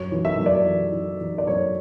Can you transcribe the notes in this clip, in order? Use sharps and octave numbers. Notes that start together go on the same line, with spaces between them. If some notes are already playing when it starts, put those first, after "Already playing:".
Already playing: F#2 C#5
E3
E5
F#2
D5
E3
E3
E3
D5
F#2 C#5